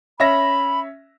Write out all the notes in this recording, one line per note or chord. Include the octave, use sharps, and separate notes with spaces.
C#4 E5 B5 A#6